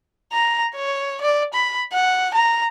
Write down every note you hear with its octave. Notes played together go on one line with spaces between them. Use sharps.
A#5
C#5
D5
B5
F#5
A#5